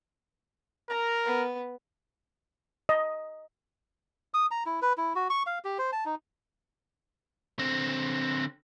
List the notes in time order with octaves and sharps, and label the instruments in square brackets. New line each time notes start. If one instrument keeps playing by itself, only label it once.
[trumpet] A#4 [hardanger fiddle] A#5
[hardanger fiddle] B3 B4
[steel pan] D#5
[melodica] D#6
A#5
E4
B4
E4
F#4
C#6
F5
G4
C5
A5
D#4
[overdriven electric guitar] D3 C4